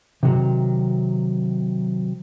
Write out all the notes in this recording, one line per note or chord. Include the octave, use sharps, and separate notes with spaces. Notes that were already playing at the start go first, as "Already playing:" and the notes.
C3 D#3 F#3